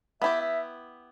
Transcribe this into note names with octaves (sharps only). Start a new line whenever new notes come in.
B3 E4 G4 E5
E5